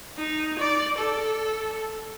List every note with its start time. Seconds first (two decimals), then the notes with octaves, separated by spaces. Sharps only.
0.17 D#4
0.59 D5
0.98 A4